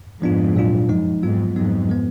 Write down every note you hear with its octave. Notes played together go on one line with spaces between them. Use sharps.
F2 G#2 F3 B3 D4 F4
A#2 F#3 D4 F4
F#2 F3 G#3 D#4
F2 G#2 F#3 B3 F4
F2 G#2 F#3 B3 D#4
F3 G#3 B3